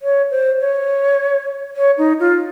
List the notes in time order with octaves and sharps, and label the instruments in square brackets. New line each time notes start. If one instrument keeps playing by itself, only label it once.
[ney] C#5
C5
C#5
C#5
D#4
F4